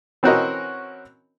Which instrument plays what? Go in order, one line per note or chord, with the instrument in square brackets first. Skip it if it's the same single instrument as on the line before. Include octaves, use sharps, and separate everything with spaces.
[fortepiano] E3 C4 C#4 F#4 A#4 D#5